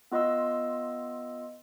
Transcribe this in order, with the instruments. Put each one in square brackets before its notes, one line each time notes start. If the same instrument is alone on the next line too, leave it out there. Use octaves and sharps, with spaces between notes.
[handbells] B3 F4 D#5 C6 E6